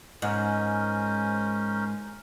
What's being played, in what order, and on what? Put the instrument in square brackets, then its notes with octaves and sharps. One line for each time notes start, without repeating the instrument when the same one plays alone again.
[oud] G#2 [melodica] C#4 A#4 C5